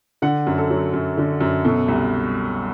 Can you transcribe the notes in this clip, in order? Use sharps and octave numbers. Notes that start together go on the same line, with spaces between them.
D3 F#5
F#2
A4
F#3
F#2
D3
F#2
B2 A4
C2